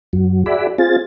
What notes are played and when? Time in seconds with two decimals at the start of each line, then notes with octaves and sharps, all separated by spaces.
0.13 F#2 F#3
0.46 F#4 G#4 D5 E5 B5
0.78 C4 F4 G#4 A6